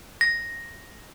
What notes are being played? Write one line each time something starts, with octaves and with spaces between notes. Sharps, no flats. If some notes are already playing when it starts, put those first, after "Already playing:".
A#6